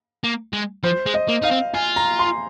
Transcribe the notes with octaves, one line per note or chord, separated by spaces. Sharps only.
A#3
G#3
F3 C5
G#3
D#5
A#3
D#4 F5
C4
F4 G#5
A#5
C6